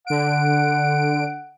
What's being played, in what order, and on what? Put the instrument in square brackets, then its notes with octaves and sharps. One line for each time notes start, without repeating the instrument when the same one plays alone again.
[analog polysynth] D3 D7 [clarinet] F#5